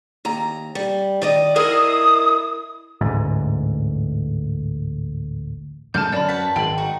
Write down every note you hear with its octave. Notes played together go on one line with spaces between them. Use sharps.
D#2 A#5
G3
D#3 D5 D#5
E4 A#4 D#5 D#6
A1 D2 G#2
F#2 D3 G#3 A5 D6 F6 G6
F#2 D5 A5 B5
F#4 B4 A5 B6
G#1 G5 C6 F#7
D#4 F#4